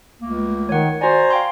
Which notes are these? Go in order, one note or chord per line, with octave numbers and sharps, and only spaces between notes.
C#2 A3 A#3
D#3 C#5 F#5
F#4 C5 D5 G#5 A#5
F5 G5 C6